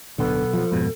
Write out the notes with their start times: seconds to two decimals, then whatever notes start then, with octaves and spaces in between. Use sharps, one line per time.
0.18 D1 B1 B2 D3 B3 A4
0.53 F3
0.72 F2 G#2 B2